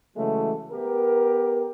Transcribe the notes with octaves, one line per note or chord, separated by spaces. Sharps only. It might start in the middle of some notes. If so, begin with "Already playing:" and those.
C#3 E3 F#3 G#3 A3
B3 G4 A#4